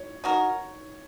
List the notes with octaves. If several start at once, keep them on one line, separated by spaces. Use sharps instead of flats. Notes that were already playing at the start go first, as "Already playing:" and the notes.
Already playing: C#5
D#4 F#4 A#4